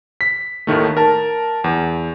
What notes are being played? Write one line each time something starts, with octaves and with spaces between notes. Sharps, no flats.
B6
D#2 A2 D#3 A3
A#4 A5
E2